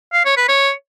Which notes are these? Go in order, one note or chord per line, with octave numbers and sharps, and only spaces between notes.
F5
C#5
B4
C#5